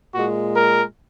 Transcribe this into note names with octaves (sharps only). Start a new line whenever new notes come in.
A#2 G#3 F#4
A#4